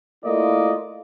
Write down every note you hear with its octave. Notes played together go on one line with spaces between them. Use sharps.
A3 A#3 E4 F4 D5 D#5